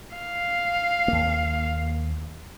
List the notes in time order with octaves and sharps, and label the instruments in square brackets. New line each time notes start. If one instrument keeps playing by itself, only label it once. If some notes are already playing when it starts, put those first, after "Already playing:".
[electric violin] F5
[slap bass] D#2 A#3